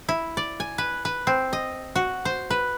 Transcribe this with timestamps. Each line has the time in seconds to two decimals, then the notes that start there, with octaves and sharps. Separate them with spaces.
0.09 E4
0.37 D5
0.60 G#5
0.78 B4
1.05 B4
1.27 C4
1.53 D#5
1.95 F#4
2.25 C5
2.50 B4